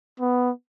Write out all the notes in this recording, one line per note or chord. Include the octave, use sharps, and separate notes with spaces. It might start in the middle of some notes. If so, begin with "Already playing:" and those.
B3